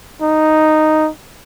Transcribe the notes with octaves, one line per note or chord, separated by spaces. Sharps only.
D#4